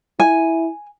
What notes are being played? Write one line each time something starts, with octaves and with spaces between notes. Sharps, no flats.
E4 G#5